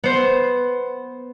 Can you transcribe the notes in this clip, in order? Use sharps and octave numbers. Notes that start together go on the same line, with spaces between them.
B3 C5